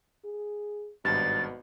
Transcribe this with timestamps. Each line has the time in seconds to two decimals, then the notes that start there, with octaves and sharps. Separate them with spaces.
0.24 G#4
1.05 G#1 G2 B2 A6